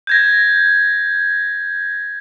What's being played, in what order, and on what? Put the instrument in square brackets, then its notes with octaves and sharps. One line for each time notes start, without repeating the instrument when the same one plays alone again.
[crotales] G6 G#6 A#6